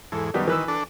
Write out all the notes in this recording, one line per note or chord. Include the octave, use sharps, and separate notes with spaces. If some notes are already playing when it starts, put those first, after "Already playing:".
E2 G#2 A4
F#2 D#3 G3 B3
E3 B4 E6
D4 A4